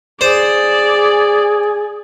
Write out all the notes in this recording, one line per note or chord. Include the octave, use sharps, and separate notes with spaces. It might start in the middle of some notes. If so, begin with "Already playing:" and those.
G#4 C5 D5